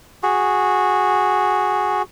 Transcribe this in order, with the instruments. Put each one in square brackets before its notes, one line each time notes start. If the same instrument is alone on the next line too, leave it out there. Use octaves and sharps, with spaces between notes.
[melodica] F#4 G#4